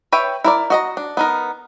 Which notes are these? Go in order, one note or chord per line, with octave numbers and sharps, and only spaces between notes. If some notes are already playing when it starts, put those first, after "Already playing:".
B4 C#5 E5 G5
E4 A#4 D5
F#4 D#5 A#5
D4
B3 D#4 A#4